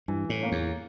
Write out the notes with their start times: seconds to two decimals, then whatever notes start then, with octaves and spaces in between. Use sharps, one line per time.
0.08 G2 E3
0.29 A2
0.41 A#3 C#4
0.52 E2